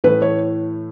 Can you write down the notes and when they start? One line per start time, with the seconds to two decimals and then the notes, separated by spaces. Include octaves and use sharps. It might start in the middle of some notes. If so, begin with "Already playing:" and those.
0.04 A2 E3 A3 B4
0.22 C#5